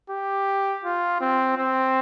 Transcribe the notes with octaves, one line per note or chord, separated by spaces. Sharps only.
G4
F4
C4
C4